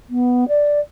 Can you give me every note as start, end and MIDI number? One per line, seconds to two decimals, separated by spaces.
0.09 0.44 59
0.48 0.79 74